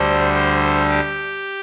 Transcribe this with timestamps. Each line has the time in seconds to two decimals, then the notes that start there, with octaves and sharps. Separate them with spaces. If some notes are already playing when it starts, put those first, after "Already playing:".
Already playing: D2 D3 G3 C5
0.34 C5
0.89 G4